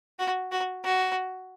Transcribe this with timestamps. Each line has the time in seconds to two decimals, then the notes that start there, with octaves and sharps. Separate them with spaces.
0.19 F#4
0.51 F#4
0.84 F#4